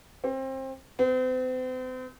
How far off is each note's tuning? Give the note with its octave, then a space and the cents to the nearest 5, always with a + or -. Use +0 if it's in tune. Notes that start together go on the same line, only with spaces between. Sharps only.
C4 +25
C4 -40